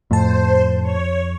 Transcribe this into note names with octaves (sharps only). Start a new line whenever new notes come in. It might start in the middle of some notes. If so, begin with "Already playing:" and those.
F2 A2 C5 A5
C#5